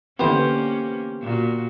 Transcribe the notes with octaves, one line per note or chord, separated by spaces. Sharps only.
D3 E3 A#3 B3 C#4 G4 C5
A#2 F#4